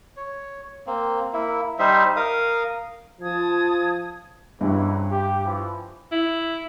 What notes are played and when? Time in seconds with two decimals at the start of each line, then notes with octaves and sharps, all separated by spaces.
0.17 C#5
0.87 A#3 C4
1.33 A#3 E4
1.79 G3 D#4 C5 E5
2.16 A#4 F5 D#6
3.21 F3 A5 D#6 G#6
4.61 C#2 G2 C3 E3
5.11 G4
5.45 E3 F3
6.12 E4